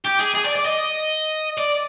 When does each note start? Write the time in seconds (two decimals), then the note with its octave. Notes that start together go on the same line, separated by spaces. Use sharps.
0.05 G4
0.20 G#4
0.35 G#4
0.45 D5
0.56 D5
0.66 D#5
1.58 D5